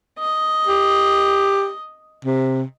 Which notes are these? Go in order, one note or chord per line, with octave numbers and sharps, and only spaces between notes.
D#5
G4
C3